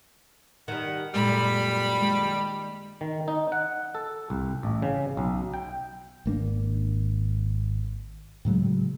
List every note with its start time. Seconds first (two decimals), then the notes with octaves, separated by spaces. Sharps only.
0.68 D#3 G3 F#5 A5 A#5
1.14 F#2 A#2 G3 G#3 E4 A4 B5
1.99 D#3 G#3
3.01 D#3
3.28 D#4
3.52 F#5
3.95 A4
4.30 C2
4.63 A1
4.82 C#3
5.17 B1
5.54 G5
6.26 G#1 A#3 D4
8.45 A2 C#3 F#3 G#3